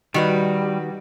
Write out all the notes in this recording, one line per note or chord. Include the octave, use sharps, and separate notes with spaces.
D#3 G3 F#4 B4